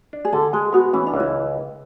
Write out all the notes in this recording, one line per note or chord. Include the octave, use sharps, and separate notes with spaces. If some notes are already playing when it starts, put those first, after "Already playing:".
D4
G#4
D3 A4
G#3 G#4
B3 F#4
E3 C#4
D4
C#2
E4